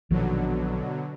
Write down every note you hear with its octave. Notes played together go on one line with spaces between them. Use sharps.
A#1 B2 D3 D#3 F3 F#3